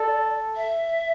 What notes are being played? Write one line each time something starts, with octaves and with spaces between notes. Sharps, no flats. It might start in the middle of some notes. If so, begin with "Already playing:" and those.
Already playing: A4 D5
E5